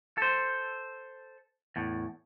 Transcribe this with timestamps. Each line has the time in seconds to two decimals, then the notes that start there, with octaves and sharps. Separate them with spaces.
0.18 A4 C5
1.76 E2 A2